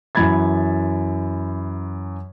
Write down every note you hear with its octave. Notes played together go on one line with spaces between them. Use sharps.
F#2 E3 F#3 B5 G#6 A6